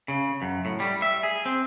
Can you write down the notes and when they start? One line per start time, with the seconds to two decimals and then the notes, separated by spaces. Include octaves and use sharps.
0.08 C#3
0.42 F#2
0.65 A2
0.80 G3
1.02 E5
1.23 G#4
1.46 C4